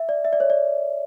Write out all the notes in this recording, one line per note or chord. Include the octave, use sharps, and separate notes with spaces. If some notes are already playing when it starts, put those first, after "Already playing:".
Already playing: E5
D5
E5
D5
C#5
D5